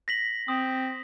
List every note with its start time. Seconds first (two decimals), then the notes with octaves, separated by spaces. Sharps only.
0.08 A#6 B6 F#7
0.48 C4 D#6